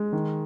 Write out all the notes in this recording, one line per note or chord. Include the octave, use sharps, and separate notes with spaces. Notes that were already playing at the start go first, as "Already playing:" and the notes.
Already playing: G#3
D#3